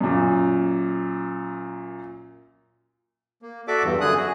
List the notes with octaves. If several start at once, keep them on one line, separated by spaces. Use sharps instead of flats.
F#2 A#2
A#3
F#4 A4 D5 E5 D6
E2 G2
F#2 D3 G#4 D#6 F#6
F#4 G#4